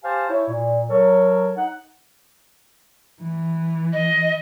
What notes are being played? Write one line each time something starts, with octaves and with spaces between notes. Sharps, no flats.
G4 C5 F5 G#5 A5
E4 C#5
A#2
F#3 A4 A#4 C#5
D#4 F#5
E3
D#5